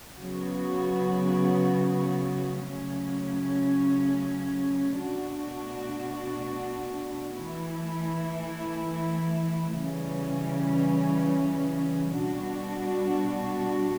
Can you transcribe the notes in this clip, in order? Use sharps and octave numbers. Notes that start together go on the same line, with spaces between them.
C#3 F#3 B3 F#4
C#3 F#3 A3 C#4
B2 A3 D4 F#4
E3 A3 E4
C#3 E3 G3 C#4
B2 G3 D4 F#4